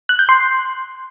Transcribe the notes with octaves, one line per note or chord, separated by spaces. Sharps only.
F#6
G6
C6